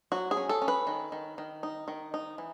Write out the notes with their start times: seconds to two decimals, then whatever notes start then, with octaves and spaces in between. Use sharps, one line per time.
0.12 F#3 F#4
0.31 G#4
0.37 C#4
0.49 A4
0.62 C#4
0.68 B4
0.87 D#3
1.12 D#3
1.38 D#3
1.63 D#4
1.88 D#3
2.14 D#4
2.38 E3